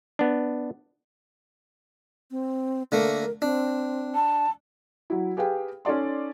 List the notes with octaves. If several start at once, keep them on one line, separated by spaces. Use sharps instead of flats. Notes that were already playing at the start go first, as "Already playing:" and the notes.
B3 D4
C4
D3 A3 A#3 A#4
C4 D4
A5
F#3 E4
G4 G#4 B4 F5 G5
C#4 D#4 A4 D5 C6